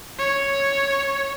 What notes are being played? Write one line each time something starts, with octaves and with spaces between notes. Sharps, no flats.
C#5